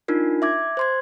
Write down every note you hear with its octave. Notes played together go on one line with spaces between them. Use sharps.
D4 D#4 F4 A#4
E5 D6 G#6
C5 C6 G#6